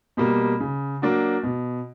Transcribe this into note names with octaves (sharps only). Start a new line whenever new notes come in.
B2 G3 A#3
C#3
F#3 A#3 D4 F#4
B2